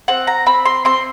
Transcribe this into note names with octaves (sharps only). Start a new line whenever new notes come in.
C4 F#5
A#5
C4 B5
C6
C4 C6